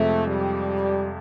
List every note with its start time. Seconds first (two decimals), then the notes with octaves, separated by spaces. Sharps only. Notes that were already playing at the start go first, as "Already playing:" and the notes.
Already playing: F2 C3 F3 G#3 A3
0.26 G3